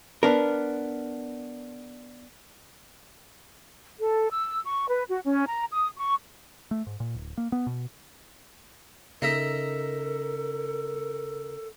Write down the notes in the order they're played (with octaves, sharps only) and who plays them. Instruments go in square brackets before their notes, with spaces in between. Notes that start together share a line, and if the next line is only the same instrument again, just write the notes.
[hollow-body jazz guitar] B3 D4 A#4
[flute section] A4
E6
C#6
B4
F#4
C#4
A#5
D#6
C#6
[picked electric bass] A3
G#2
A#2
D1
A#3
B3
B2
[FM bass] C#3 [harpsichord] D#4 D#5 E5 [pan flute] A4 [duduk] A#4